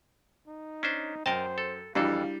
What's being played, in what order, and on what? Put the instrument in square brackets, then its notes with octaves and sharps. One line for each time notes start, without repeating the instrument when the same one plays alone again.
[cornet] D#4
[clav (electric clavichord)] C#4 D4 C5
[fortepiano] F#2 [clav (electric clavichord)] A#4 D#5 A5 [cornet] C5 [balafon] G5
[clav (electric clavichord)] A4
[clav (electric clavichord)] F2 E3 A4 [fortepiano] G3 [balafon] D4 E4 F#4 [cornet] F5